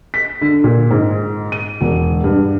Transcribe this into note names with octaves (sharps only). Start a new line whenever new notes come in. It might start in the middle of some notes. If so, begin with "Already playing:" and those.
B6
D3
A#2
G#2
D#7
E1
G2